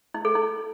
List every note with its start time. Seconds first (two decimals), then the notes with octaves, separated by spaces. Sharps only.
0.14 E4
0.25 A4
0.35 E4